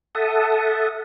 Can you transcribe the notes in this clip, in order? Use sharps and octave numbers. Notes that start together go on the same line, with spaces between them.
A4 E5 F#5 A5 D#6